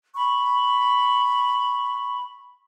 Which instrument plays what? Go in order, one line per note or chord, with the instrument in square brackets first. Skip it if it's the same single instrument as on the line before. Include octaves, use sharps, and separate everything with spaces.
[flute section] B5 C#6